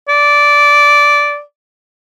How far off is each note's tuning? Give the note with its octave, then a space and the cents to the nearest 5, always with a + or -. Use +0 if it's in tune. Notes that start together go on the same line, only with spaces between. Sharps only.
D5 -10